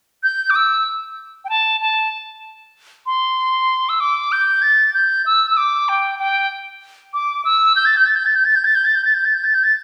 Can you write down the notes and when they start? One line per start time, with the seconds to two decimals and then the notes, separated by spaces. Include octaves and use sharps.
0.23 G6
0.50 D6
0.55 E6
1.45 G5
1.49 A5
1.81 A5
3.06 C6
3.89 E6
4.00 D6
4.32 G6
4.62 A6
4.94 G6
5.26 E6
5.51 E6
5.57 D6
5.89 G5
6.19 G5
7.14 D6
7.45 E6
7.76 G6
7.86 A6
7.97 G6
8.06 A6
8.16 G6
8.26 A6
8.35 G6
8.45 A6
8.56 G6
8.65 A6
8.75 G6
8.85 A6
8.96 G6
9.05 A6
9.15 G6
9.25 A6
9.35 G6
9.44 A6
9.55 G6
9.64 A6